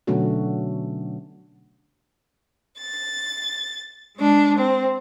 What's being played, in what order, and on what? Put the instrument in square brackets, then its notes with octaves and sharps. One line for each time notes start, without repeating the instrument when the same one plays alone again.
[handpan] B2 D3 F#3 A3 C#4 F#4
[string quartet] A6
G#3 D4
C4